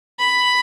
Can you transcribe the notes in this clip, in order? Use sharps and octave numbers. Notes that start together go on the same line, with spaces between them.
B5